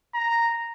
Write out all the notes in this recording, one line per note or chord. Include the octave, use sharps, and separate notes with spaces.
A#5